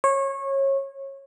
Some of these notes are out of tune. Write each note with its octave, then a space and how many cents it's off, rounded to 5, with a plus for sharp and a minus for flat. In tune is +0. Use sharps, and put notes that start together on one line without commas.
C#5 -25